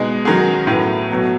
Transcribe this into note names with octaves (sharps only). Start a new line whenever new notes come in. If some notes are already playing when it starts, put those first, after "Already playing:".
Already playing: B2 G#3 D#4 G#4
D#3 F#3 C#4 G#4
A2 F#3 B3
B2 F#3 A3